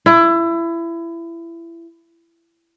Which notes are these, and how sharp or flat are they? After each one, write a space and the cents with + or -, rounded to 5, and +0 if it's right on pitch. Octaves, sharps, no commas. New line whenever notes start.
E4 +25